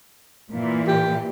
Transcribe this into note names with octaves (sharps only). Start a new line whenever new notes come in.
A#2 E3
G4